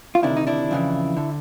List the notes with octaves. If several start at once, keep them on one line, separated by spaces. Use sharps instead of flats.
F4
D2 C3 D#3 D4 E4
D#4
D4 E4
F2 C#3 E3
D3